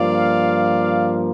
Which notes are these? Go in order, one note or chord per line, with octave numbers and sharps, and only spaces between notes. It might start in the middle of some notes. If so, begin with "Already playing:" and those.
Already playing: G2 F3 A#3 D5 F5